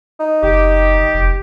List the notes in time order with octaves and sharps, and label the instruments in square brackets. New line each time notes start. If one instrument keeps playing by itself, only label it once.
[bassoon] D#4
[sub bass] F#1 [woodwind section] G4
[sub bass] F1